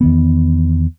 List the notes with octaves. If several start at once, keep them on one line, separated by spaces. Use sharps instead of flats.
E2 D#3 B3